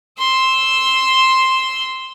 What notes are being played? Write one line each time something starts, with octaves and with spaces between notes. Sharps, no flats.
C6 E6